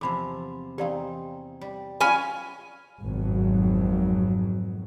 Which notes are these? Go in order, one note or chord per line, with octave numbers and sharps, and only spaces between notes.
E2 C3 F3 B5 D6
E2 C4 D#4 G4 D5 F5
G3
F#3 C#4 F4 D#5 F5 G#5 B5
G#1 F2 B2 F#3